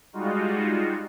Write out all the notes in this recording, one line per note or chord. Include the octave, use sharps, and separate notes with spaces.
G3 G#3 D#4 F4 F#4